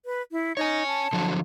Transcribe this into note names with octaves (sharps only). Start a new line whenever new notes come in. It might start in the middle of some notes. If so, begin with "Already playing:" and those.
B4
E4
D#4 C#5 G#5
A5
D3 F3 F#3